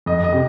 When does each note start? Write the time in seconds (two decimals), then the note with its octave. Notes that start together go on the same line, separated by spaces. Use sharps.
0.06 F2 D#5
0.24 D#5
0.32 C3